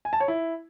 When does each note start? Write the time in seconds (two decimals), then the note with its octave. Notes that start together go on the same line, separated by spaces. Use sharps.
0.05 G#5
0.13 A5
0.20 C#5
0.28 E4